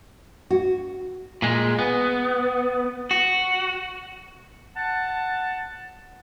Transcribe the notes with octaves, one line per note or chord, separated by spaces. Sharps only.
F#4
A#2 G#3
B3
F#4
F#5 A5